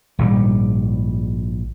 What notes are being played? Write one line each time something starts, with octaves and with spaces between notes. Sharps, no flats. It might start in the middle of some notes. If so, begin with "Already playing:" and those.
A#1 G#2 C#3 G3